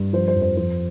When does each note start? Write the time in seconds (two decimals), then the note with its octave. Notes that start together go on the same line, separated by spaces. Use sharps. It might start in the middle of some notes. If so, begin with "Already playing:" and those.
Already playing: G2
0.13 F3 C5
0.28 C5
0.35 F2
0.42 C5
0.57 F3 C5